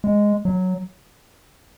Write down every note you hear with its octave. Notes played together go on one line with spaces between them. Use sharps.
G#3
F#3